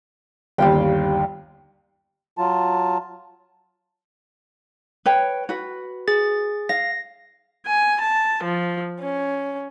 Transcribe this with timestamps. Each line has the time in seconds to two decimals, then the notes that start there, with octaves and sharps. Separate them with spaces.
0.58 G1 D#2 G3 F5 G5
2.38 F#3 F4 A5
5.06 B4 C#5 G5
5.49 F#4 B4
6.08 G#4 A6
6.69 F5 A#6
7.67 G#5
8.02 A5
8.43 F3
9.00 C#4